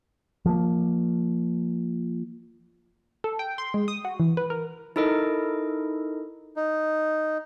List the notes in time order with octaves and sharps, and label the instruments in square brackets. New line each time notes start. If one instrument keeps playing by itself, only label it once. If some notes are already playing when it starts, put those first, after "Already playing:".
[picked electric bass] F3 A#3
[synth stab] A4
G5
C6
G#3
D#6
F#4
E3
B4
A#4
[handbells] D#4 E4 A4 A#4 D#5
[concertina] D#4